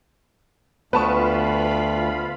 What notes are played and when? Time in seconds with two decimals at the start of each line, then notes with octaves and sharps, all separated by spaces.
0.93 D2 B3 F4 B4 F5 A5 B5 C#6